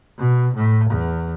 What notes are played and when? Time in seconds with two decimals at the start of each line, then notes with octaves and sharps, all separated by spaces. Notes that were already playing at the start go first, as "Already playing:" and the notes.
0.19 B2
0.55 A2
0.91 E2